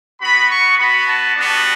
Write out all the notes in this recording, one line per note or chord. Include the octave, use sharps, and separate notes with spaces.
B3 F#4 B5
C#6
B3 F#4 B5
A5
G3 B3 D4 F#4